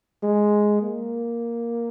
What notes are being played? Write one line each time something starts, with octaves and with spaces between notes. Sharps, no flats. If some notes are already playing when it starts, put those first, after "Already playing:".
G#3
A#3